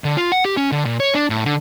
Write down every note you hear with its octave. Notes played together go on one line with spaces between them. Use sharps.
D3
F4
F#5
G4
C#4
D3
A#2
C#5
D4
A2
D3